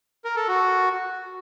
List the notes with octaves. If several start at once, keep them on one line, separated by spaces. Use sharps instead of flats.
A#4
A4
F#4